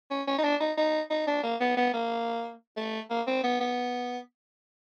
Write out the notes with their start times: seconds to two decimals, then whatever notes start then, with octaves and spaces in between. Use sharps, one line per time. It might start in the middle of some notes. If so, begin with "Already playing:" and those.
0.10 C#4
0.27 C#4
0.38 D#4
0.44 D4
0.60 D#4
0.77 D#4
1.10 D#4
1.27 D4
1.43 A#3
1.60 B3
1.77 B3
1.94 A#3
2.77 A3
3.10 A#3
3.27 C4
3.43 B3
3.60 B3